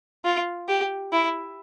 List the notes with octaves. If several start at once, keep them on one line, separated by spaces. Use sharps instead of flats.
F4
G4
E4